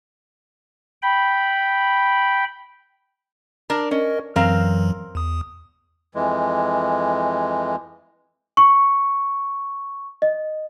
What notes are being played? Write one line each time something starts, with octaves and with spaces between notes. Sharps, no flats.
G5 B5
D4 A#4
C#4 A#4 D#5
F#2 E3 F#3 C4 A#4 F5
E2 D#6
F2 E3 G#3
C#6
D#5